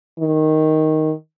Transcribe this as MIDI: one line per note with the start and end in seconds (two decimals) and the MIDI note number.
0.20 1.13 51